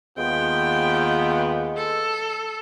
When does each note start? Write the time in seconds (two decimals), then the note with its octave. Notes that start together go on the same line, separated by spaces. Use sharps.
0.18 D#2 G#3 B3 F4 G5
1.77 A4